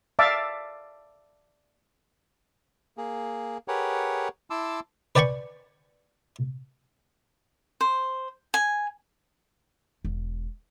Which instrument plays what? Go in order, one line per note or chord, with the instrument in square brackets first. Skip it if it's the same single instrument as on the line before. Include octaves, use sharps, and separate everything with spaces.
[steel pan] D5 E5 F5 A5 D6
[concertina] A#3 G#4
G4 G#4 A#4 B4 C#5 F#5
E4 A5 C6 D6 E6
[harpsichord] B4 D5 G5 G#5 B5 C#6
[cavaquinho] C5
G#5
[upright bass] E1